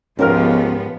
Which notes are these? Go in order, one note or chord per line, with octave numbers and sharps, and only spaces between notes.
C#2 G#2 F3 B3 C#4 G4 A#4 F6